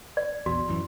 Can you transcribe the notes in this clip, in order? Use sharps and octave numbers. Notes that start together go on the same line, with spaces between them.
D5
A#1 E2 F#4
A1 F#2 E3